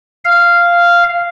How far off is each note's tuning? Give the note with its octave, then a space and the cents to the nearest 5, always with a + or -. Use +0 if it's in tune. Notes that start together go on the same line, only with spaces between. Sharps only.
F5 -10